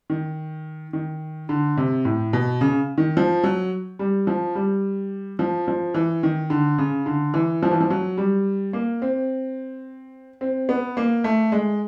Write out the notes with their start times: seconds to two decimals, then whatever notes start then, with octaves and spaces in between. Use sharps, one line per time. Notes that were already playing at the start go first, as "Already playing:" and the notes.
0.10 D#3
0.93 D#3
1.49 D3
1.77 C3
2.05 A2
2.33 B2
2.61 C#3
2.98 D#3
3.17 F3
3.44 F#3
3.99 G3
4.27 F3
4.55 G3
5.39 F3
5.68 F3
5.94 E3
6.23 D#3
6.50 D3
6.78 C#3
7.06 D3
7.34 E3
7.63 F3
7.71 E3
7.80 F3
7.90 F#3
8.18 G3
8.73 A#3
9.02 C4
10.41 C4
10.69 B3
10.97 A#3
11.24 A3
11.52 G#3